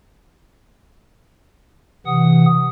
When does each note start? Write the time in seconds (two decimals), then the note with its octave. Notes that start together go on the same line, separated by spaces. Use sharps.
2.06 C3 E3 F#5 D#6